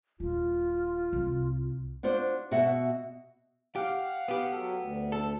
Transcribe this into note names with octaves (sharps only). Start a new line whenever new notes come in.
D#1 F4
C2
D4 F4 F#4 C5 D5
B2 F#4 E5 F#5
G4 F5 F#5
B3 G4
F#3 A4
D2
A4